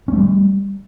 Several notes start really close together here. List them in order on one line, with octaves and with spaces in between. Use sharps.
C#4 A3 G3